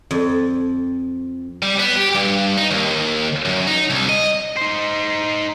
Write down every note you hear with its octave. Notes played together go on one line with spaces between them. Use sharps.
F2
G3
B3
G4
G2
D#4
D#2
F#2
D#4
C2
D#5
D#4 C5